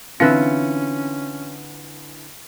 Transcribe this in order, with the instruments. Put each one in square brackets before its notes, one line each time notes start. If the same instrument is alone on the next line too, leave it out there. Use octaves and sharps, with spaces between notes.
[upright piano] D3 E3 C#7 [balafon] C4 [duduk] C#4 [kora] F4 B4 E5